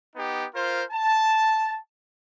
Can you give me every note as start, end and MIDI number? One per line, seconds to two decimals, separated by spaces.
0.16 0.45 59
0.16 0.45 63
0.16 0.45 67
0.55 0.83 65
0.55 0.83 70
0.55 0.83 72
0.90 1.77 81